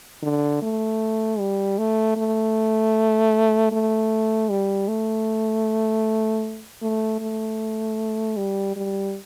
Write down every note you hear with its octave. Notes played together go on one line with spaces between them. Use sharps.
D3
A3
G3
A3
A3
A3
G3
A3
A3
A3
G3
G3